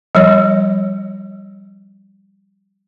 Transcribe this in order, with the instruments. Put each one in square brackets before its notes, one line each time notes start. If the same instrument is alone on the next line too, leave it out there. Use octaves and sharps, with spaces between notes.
[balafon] F3 G3 C#5